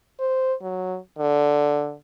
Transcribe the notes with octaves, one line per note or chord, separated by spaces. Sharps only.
C5
F#3
D3